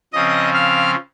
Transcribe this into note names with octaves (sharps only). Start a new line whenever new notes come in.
C#3 F3 C4 D#5 D#6
F5 F6